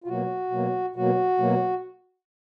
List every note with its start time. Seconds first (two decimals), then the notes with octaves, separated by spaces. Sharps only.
0.04 F4
0.07 B2 F#3 A#3 F#4
0.51 B2 F#3 A#3
0.96 B2 F#3 A#3 F#4
1.38 B2 F#3 A#3